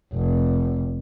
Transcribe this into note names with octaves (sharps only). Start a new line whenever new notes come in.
F1